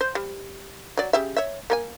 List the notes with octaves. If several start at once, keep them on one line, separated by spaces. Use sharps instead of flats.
C5
G3
F#3 D5
C#3 G4 E5
C#5 E5
A#3 A#4 G#5